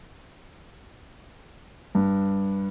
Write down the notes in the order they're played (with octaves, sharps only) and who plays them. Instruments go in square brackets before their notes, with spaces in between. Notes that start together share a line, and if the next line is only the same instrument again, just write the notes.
[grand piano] G2